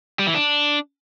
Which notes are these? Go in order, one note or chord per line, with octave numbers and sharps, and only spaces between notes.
G3
E3
D4